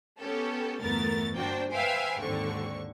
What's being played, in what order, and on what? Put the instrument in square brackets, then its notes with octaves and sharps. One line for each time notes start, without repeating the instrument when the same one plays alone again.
[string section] B3 C#4 G4 A4
G1 E2 A3 B3 A#4 A6
G1 A#3 D4 F#4 C5 G5
B4 C5 E5 F5 G5 G#5
D#2 G#2 D3 C4 C#6